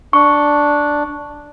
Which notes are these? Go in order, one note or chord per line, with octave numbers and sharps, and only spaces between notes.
D4 C#6